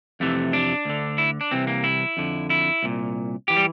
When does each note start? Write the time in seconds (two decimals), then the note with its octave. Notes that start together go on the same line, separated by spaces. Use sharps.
0.20 F2 C3 E3 A3
0.53 D4
0.85 D2 D3
1.18 E4
1.41 D4
1.51 C2 C3 E3 C4
1.67 A#3
1.84 E4
2.17 F2 D3
2.50 E4
2.83 C2 A#2
3.48 E3 G4
3.57 G3